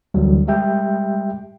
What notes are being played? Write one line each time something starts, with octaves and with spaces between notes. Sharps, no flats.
D2 D3 E3 F#3 G3
G3 G#3 G4 E5 G5 G6